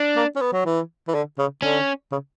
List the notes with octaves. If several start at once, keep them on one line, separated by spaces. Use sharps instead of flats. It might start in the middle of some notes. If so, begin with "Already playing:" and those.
Already playing: D4
A#3
C#4
B3
F#3
E3
E3
D3
C#3
D3 C#4
C#3